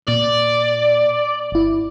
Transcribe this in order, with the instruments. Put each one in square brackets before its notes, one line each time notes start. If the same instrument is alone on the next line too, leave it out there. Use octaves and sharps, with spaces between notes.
[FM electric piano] A#2 [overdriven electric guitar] D5
[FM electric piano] G1 E4